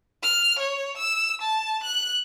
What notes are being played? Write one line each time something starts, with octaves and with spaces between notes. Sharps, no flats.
F6
C#5
E6
A5
F#6